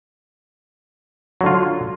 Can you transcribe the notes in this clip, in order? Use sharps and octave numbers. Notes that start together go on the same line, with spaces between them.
D3 F#3 F4